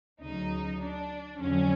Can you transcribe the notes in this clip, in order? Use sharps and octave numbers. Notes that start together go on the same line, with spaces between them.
D2 C#3 F#3 D#4
D4
F2 D3 F#3 C#4